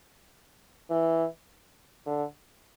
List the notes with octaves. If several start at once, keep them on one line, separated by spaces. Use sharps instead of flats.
E3
D3